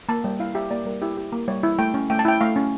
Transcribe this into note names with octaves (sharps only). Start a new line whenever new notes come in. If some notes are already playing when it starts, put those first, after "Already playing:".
A#3 A5
G3 G5
E4 F5
G4 E5
A#3 D5
G3 A#4
E4 G4
G4
A#3
G3 C#5
E4
A3 G5
C#4
A3 G5
A5
E4 G5
A3 F5
C#4